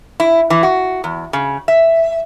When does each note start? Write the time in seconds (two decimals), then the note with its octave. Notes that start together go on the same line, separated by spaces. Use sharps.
0.20 E4
0.50 E3
0.63 F#4
1.04 E2
1.33 C#3
1.68 E5